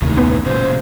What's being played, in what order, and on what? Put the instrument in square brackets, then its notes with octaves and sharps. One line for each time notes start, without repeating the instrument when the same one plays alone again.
[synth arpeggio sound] D#2 [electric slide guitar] A2 D#3 [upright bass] C3 E3
[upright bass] A#1 F#2 [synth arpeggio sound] B3 C#4 B4
[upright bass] E1 A#1 [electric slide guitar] A#2 C#3 F#3 [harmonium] C5